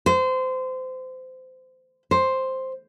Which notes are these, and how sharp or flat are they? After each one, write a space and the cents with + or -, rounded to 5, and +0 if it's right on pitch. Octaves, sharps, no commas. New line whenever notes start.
C5 -25
C5 +5